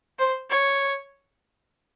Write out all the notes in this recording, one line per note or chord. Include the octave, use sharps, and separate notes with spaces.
C5
C#5